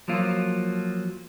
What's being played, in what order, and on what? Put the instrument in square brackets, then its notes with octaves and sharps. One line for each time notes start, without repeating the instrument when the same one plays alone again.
[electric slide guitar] F3 F#3 A#3 F4